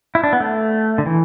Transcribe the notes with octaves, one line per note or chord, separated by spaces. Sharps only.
E4
D4
B3
A3
D3
E3